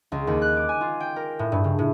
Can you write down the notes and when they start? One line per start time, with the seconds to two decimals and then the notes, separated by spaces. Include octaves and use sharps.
0.12 C#2
0.27 D#2
0.42 F#6
0.57 D6
0.69 G#5
0.81 F4
1.00 G5
1.16 A#4
1.39 A2
1.52 G2
1.64 C#3
1.79 A2